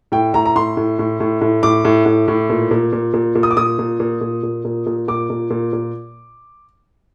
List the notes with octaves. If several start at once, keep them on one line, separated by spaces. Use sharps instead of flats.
A2 G5
A2 A#5
A#5
A2 C6
A2
A2
A2
A2
A2 D6
A2
A2
A2
A#2
A#2
A#2
A#2
A#2
D#6
D6
A#2 D#6
A#2
A#2
A#2
A#2
A#2
A#2
A#2 D6
A#2
A#2
A#2